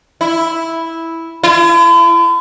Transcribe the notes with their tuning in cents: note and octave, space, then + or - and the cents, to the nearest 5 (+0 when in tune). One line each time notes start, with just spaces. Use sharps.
E4 -5
E4 +45